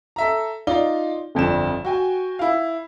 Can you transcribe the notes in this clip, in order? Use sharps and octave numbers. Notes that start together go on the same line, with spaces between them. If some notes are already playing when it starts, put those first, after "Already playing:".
A4 E5 A#5
D#4 F4 D5 G7
G1 F2 D4 E7
F#4 G5 G#5
E4 F5